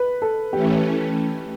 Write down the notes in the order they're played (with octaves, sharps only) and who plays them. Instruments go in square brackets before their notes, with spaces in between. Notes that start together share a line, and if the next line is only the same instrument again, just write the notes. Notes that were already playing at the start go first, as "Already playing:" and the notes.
Already playing: [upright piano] B4
A4
[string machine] E3 A3 C#4 [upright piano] G4